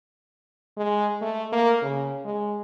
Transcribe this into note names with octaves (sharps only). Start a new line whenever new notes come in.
G#3
A3
A#3
C#3
G#3